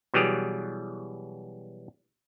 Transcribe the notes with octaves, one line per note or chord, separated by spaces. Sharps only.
B2 E3 F#3 G3 G4 G#4